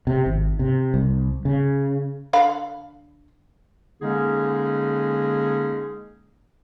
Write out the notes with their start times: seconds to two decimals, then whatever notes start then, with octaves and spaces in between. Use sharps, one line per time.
0.07 C3
0.26 G#1
0.59 C3
0.94 C2
1.45 C#3
2.33 D3 F5 B5
4.02 D3 G#3 A#3 C#4 D#4 G#4